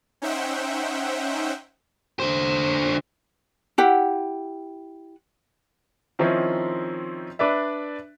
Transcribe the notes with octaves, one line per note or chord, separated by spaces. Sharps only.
C#4 D#4 C5 E5 F#5 G5
D3 C5
E4 G4 F#5
D#3 F3 C4 C#4 D#4 E4
D4 B4 D5 E5